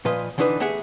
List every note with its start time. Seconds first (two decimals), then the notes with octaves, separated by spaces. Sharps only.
0.05 A#2 F3 B4 D#5
0.38 D3 E3 D4 D#4 B4
0.60 A3 G4 G#4 E5 F#5